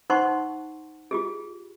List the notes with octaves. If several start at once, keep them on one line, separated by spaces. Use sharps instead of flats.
D#4 C5 F#5 A5 C6 C#6
F4 G4 G#4